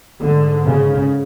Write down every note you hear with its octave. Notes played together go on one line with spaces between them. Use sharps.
G#2 D3
C#3